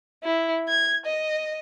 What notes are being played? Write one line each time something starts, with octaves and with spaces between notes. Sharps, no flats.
E4
G#6
D#5